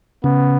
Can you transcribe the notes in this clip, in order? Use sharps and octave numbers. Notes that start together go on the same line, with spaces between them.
C#3 B3